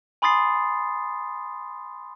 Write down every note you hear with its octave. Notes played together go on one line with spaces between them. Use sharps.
G#5 B5 C6 D#6 A6 C7